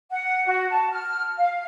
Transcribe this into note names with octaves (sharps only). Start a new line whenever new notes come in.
F#5
F#4
A5
F6
F5